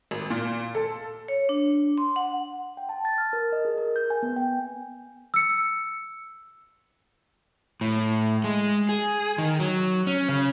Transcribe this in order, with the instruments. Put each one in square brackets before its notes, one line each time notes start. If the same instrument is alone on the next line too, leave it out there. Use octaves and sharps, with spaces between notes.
[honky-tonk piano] G#1
A#2
A4
[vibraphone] C#5
D4
C6
F#5
[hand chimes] G5
A5
A6
F6
A#4
D#5
G#4
A#4
G6
G#5
B3
G5
[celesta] E6 C#7
[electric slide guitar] A2
G#3
G#4
D#3
F#3
C#4
C#3